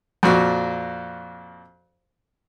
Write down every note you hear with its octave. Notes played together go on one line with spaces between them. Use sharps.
F2 A#2 F#4